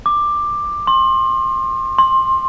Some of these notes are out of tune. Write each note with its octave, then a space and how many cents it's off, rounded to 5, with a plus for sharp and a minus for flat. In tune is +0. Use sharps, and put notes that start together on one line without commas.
D6 +10
C6 +30
C6 +20